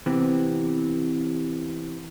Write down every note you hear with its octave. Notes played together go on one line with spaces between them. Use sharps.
C3 E3 B3 C4